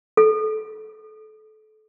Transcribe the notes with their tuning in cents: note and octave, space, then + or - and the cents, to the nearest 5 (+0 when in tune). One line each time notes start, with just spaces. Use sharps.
A4 -25